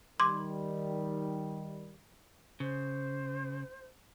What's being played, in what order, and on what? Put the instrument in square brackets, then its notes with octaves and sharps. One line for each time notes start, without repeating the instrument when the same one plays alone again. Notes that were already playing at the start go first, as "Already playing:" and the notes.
[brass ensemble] D#3 G3 [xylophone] C6 D6 G#6
[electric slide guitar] C#3 [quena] C5